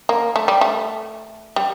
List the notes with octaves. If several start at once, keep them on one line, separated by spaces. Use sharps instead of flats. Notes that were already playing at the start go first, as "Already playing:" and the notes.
A#3
A3
G3
A3
G3